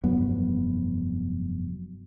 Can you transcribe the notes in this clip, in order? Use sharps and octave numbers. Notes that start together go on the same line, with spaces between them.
F1 G2 F#3 B3